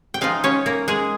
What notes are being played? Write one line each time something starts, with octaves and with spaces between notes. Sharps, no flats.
G5
F3 G#3 D#4 F4 F5
C#4 C#5
A#3 A#4
G#3 G#4